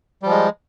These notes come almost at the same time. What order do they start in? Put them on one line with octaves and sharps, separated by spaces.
G3 F3 G#3